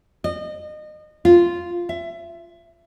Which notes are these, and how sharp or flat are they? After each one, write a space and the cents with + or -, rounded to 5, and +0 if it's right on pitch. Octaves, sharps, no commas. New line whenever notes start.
D#5 -30
F4 -5
E5 +25